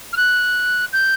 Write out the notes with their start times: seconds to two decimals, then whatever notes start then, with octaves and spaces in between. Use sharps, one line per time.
0.13 F6
0.17 F#6
0.93 G6